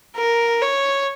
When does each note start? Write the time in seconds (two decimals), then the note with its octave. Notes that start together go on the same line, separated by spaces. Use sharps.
0.16 A#4
0.61 C#5